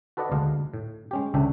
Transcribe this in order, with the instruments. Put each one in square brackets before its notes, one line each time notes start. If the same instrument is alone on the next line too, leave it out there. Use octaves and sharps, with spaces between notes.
[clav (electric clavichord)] F#4 A4 B4 D5 D#5 F#5
D2 G#3 D4 D#5 F5
A2
G#3 C#4 G4
C#2 D3 C#4 D4 E5 G5